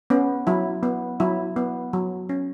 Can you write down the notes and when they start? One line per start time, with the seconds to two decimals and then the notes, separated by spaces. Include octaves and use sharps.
0.10 B3 C#4
0.47 F#3 E4
0.83 B3
1.20 F#3 E4
1.56 B3
1.93 F#3
2.29 C#4